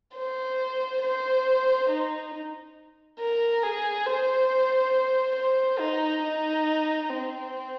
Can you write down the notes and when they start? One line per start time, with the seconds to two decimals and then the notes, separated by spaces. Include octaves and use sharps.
0.16 C5
1.03 C5
1.90 D#4
3.20 A#4
3.63 G#4
4.07 C5
5.36 C5
5.80 D#4
6.23 D#4
7.10 C4